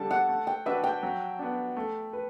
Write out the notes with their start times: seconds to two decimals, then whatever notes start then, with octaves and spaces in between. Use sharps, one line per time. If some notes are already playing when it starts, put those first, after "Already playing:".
Already playing: D3 G3 D4 A4 A5
0.11 F#5
0.29 A3
0.47 G5
0.66 D4 F#4 B4 E5
0.84 G5
1.03 F#3
1.39 B3 D4
1.77 A3
2.13 B4